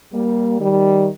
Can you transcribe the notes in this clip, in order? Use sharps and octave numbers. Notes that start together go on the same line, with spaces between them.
G3 A#3
D#3 G3